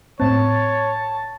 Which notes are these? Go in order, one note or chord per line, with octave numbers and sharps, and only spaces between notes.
A2 C4 C#5 A5